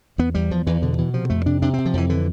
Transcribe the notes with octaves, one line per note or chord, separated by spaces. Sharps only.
E2 B3
E2 G3
E2 F3
E2 E3
B2 D3
B2 E3
C3 F3
F2 A3
C3 D4
C3 D4
C3 C4
F3
F2 E3
D3 E3